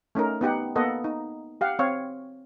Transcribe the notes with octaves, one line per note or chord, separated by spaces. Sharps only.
A3 C#4 D#4 A#4
B3 D#4 G4 F#5
A#3 B3 A4 D#5 F#5
D#4
G4 F5 F#5
C4 C#5 F5